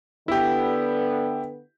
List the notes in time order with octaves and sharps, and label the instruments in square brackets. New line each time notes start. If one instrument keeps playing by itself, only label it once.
[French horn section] D3 B3 [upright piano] E4 G4